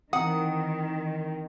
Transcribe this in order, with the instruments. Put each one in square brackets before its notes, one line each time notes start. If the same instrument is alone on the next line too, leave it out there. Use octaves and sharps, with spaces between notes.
[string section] D#3 [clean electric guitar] E3 C4 A#4 [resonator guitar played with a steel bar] F#5 [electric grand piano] D#6